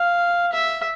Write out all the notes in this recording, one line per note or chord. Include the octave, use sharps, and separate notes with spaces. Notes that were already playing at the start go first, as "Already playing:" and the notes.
Already playing: F5
E5